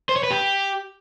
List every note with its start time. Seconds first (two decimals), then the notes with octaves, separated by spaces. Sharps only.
0.09 C5
0.16 C#5
0.23 B4
0.31 G4